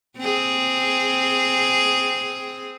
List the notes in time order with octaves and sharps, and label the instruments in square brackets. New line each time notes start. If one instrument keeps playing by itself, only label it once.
[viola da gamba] C4 G#4